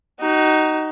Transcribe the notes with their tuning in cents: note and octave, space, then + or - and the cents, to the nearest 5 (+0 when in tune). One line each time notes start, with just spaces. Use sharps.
D#4 +0 F#4 +35